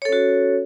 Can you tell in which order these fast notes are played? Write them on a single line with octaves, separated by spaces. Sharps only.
C#5 A4 C#4 F#4